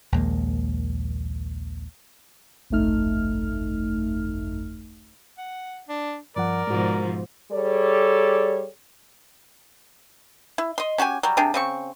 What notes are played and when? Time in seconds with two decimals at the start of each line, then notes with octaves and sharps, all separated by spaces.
0.12 A#1 D#2 G#3 A#3
2.70 G1 C2 F2 A3 D#4 F6
5.38 F#5
5.88 D4
6.36 G2 F3 A#4 D5 F#5
6.67 G#2 B2 F3 G#3 F#4
7.52 G3 G#4 A4 C#5 D5
10.58 E4
10.78 D#5 C6
10.98 C#4 F#4 G4 G#5
11.23 F#3 G3
11.37 C3 D4 G4 G#4
11.54 C#3 C4 C#6